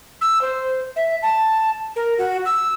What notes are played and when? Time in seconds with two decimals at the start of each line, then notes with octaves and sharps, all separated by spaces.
0.21 E6
0.41 C5
0.96 E5
1.22 A5
1.96 A#4
2.18 F#4
2.46 E6